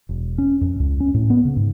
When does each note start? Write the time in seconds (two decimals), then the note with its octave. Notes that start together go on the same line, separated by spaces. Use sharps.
0.09 E1
0.38 C#4
0.61 F2
0.80 C#2
1.00 C#4
1.14 A2
1.30 B3
1.45 C#3
1.56 G#2